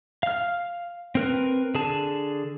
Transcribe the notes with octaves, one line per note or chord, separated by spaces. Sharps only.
F5 F6
C4 A#4 B4
D3 G#4 A5